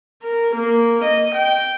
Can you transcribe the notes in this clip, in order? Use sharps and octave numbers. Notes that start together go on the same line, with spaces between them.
A#4
A#3
D#5
G5